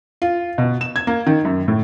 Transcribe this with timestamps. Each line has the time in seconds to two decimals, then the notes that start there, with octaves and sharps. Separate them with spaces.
0.22 F4
0.58 B2
0.81 E7
0.96 G#6
1.07 A#3
1.27 D#3
1.45 F#2
1.68 A2